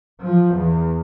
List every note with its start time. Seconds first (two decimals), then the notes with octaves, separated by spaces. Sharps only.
0.23 F3
0.57 E2